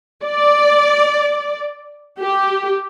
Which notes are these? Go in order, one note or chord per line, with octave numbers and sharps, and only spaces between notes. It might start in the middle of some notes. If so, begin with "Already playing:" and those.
D5
G4